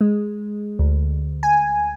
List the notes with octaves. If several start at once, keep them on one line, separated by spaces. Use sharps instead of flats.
G#3
D2
G#5